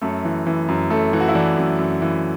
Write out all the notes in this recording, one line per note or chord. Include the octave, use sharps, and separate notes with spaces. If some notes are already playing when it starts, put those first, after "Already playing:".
F#2 A3 A4
E3
E3
F#2
F#2 A3 A4
E3
F#4
E4
E3 D4
F#2
F#2
E3